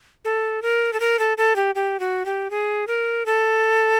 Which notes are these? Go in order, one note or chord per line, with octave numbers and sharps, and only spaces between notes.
A4
A#4
A4
A#4
A4
A4
G4
G4
F#4
G4
G#4
A#4
A4